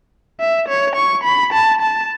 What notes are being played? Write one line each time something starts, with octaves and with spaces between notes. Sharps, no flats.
E5
C#5
C#6
B5
A5
A5